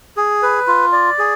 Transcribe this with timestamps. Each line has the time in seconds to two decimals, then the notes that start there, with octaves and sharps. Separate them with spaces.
0.17 G#4
0.43 B4
0.67 F4
0.93 D5
1.18 G#4